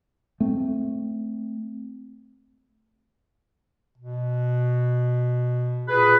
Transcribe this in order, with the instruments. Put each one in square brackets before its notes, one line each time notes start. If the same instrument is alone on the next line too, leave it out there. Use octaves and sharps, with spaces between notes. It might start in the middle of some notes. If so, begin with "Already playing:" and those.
[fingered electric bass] A3 C4
[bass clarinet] B2
[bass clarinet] A#2 [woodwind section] G#4 B4